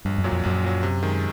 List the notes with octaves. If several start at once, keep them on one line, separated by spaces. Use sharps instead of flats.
A#1 G2
F#2
A#2 F#3
F2
A#1 F#2
A#2 F#3
C3
D#3 G#3